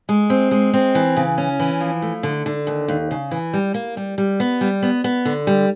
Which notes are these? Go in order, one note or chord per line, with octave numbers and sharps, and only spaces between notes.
G#3
C4
G#3
C4
E3
C#3
C#4
E3
F3
A3
D3
D3
D#2
D#2
C#3
E3
G3
A#3
G3
G3
B3
G3
B3
B3
D3
G3